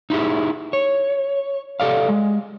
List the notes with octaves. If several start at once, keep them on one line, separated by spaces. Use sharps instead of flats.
D#4 E4 G4 G#4
C#5
G4 A4 D5 F5
G#3